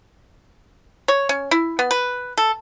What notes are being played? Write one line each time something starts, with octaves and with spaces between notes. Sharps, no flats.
C#5
C#4
E4
B3
B4
A4